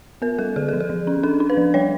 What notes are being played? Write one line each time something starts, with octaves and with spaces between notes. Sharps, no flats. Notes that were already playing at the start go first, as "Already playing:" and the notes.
B3 A#4
G3 A4
D3 G#4
F3 A4
G#4
F3
C#4
D4 A4
D4
B4
F3
G3 C#5